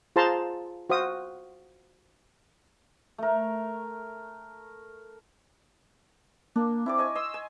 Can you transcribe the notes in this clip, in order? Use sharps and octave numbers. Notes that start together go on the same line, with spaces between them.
F4 G#4 C5 A5 A#5 C6
F#4 C5 F5 D#6
A3 A#4
A#3 D4
C4 E4 D5 D6
D#5 G#5 C#6
D#5 C6 D#6 E6
G#5